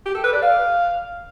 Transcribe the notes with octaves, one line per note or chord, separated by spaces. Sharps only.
G4
A4
B4
D5
F5